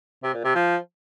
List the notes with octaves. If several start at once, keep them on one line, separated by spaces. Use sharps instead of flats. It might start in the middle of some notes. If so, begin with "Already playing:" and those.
C3
A#2
C3
F3